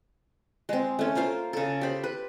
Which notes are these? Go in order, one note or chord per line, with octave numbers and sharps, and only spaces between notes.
G#3 C4
A3 C#4
A#3 F4 C5 F5
C#3 A4
G4 C5 B5
B4